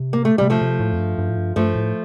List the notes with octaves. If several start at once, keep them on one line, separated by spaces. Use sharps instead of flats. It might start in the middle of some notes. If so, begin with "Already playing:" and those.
Already playing: C3
A#3
A3
C3 G3
F3 A3
C3
A2
F2
G2
G2
A2
G2
G2 F3 A3
A2